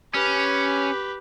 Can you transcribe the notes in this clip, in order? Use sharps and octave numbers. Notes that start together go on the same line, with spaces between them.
C#4 G4 B4